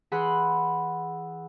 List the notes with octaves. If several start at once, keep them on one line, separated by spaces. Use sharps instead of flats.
E3 G#4 F#5 B5 C6